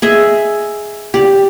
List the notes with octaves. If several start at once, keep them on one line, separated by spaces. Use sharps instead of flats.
G#4 D#5 E5
G4 D5